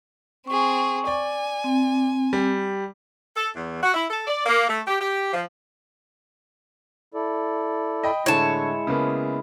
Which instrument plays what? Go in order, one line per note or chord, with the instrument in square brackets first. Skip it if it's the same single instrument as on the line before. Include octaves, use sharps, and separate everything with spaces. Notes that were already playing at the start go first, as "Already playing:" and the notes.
[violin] C4 G#4 [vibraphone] C#6
[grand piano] D5 [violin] G#5
[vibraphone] C4
[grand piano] G3
[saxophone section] A4
E2
F#4
E4
A4
D5
A#3
A3
G4
G4
F3
[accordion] E4 A4 D5
[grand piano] D#5 G5 B5
[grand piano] A2 D3 [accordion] G#3 E4 [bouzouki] C#5 A5
[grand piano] C#3 A#3 B3